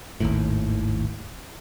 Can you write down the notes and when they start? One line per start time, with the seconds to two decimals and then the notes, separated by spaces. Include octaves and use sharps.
0.20 G#1 D#2 A2